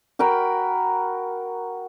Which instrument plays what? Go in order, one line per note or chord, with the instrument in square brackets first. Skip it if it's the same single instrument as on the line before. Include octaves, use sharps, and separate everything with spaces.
[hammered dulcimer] F#4 A#4 G5 B5